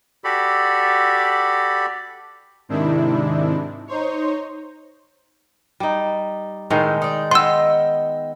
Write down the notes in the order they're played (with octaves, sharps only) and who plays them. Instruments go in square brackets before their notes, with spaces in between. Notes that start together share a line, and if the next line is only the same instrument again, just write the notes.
[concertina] F#4 G4 A4 D5 B5
[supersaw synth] G#2 C3 D#3 D4 E4
D#4 C5 C#5
[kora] G3 D#4
[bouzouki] A2 C4 [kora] D#3 G#3
[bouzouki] D#4 D5
[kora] B3 F5 [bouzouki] D#5 G5 [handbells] C6 E6